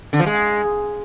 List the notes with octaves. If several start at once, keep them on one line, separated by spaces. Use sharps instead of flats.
D3
F3
G#3